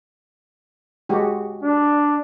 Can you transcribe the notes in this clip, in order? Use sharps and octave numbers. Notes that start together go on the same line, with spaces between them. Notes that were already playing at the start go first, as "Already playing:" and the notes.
G#3 F#4 G4
D4